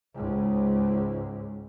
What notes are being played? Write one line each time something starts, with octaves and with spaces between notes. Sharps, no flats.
C#2 G#2